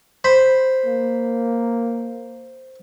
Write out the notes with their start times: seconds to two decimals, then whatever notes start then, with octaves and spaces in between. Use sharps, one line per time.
0.24 C5 B5
0.86 A#3